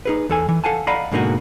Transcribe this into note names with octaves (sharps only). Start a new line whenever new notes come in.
D#4 G#4 B4
E2 A4 G#5
E3
A4 F5 F#5 G#5 A5
D5 D#5 F5 F#5 A#5 B5
G#2 B2 D3 A#3 D#4 F#4